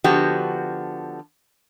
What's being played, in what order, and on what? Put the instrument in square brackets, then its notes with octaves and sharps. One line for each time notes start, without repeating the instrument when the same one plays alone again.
[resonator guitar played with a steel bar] D3 F3 B3 F#4 G4